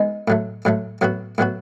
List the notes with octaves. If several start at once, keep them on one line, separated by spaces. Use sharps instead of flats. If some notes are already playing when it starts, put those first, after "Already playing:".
Already playing: G#3 B3 D#4
A2 F#3 A3
A2 F#3 A3
A2 F#3 B3 F#4
A2 F#3 B3 F#4